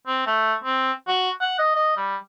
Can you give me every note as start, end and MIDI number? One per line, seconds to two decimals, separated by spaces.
0.07 0.25 60
0.27 0.54 57
0.64 0.92 60
1.08 1.30 66
1.41 1.54 78
1.59 1.74 75
1.75 1.97 75
1.97 2.16 55